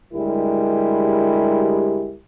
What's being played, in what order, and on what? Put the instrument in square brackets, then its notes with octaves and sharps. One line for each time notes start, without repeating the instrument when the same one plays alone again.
[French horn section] D2 G3 G#3 E4 G4 A#4